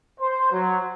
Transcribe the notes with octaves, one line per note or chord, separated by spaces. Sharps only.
C5
F#3